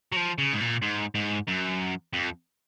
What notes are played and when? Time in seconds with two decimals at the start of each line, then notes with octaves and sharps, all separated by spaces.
0.12 F#3
0.16 F3
0.38 C#3
0.53 G#2
0.61 A#2
0.82 G#2
1.15 G#2
1.47 F#2
2.13 F2